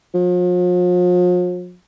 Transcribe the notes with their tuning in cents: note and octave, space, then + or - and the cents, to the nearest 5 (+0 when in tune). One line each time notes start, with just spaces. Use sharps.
F3 +45